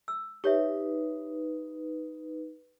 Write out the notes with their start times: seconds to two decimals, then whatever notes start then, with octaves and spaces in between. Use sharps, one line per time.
0.08 E6
0.44 D#4 G4 B4 C#5 E5